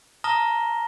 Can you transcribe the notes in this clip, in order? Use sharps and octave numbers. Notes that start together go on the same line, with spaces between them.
A5 A#5 D#6 F6 A#6 G7